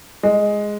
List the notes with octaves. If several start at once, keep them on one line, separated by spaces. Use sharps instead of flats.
G#3